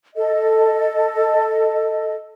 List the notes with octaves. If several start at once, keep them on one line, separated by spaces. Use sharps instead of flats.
A4 D#5